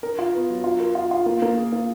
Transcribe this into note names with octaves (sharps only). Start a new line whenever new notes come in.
A#4
F4
B3
F#3
F4
A#4
F4
F4
A#3
A#3
G#4
A#3